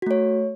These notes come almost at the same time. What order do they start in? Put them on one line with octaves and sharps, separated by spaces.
F#4 A3 C#5